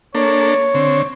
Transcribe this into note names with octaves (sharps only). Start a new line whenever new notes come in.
A#3 D4 A4 C#5
D3 C4